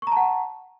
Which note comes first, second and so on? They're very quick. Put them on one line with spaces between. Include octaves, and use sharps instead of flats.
C#6 A#5 A5 F#5